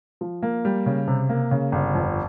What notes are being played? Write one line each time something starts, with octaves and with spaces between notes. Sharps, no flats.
F3
A#3
G3
C#3
C3
A#3
C#3
G1
F2